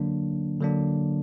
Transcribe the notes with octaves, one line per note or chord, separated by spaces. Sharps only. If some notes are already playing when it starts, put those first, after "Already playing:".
Already playing: D3 F#3 A#3 D4
D3 F#3 A#3 D4